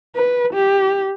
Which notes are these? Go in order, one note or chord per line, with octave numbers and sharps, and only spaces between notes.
B4
G4